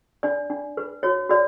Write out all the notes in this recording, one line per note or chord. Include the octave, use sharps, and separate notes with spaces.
D4 D5
D4
B4
F#4 C#5
F#4 D5